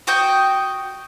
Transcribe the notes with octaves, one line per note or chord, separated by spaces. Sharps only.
F#4 D#5 G5